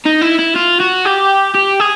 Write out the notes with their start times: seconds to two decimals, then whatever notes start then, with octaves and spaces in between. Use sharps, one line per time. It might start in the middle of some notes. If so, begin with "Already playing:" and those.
0.05 D#4
0.21 E4
0.39 E4
0.56 F4
0.80 F#4
1.05 G4
1.55 G4
1.80 G#4